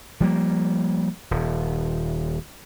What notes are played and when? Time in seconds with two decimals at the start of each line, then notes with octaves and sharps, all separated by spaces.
0.20 F3 G3 A#3
1.31 D#1